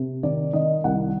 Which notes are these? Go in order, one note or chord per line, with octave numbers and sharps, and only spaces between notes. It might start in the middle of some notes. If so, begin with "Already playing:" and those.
Already playing: C3
D#3 D5
D#3 D#5
C2 F#5